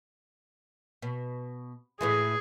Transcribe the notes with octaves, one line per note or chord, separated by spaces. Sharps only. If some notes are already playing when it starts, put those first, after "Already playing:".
B2
A2 E3 G#3 G#4